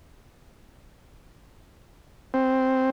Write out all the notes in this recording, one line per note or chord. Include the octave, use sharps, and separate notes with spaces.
C4